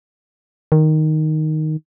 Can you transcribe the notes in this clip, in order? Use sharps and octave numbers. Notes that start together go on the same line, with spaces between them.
D#3